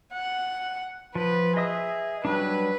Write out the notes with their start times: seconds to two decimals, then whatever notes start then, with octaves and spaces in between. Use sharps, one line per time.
0.14 F#5
1.15 F3 B4
1.57 G#4 D#5 E5 D#6
2.25 F#3 G3 D4 B4